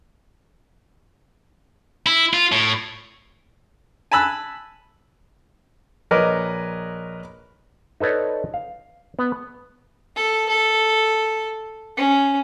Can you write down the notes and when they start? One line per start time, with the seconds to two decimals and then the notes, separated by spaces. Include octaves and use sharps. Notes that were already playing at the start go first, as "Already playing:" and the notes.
2.07 E4
2.33 F4
2.52 A2
4.12 G#5 A5 B5 E6 F#6
6.11 A#1 A#4 B4 C#5 D#5 D6
8.00 D#4 A4 B4 C#5 D5
8.54 F5
9.19 B3
10.16 A4
10.49 A4
11.97 C#4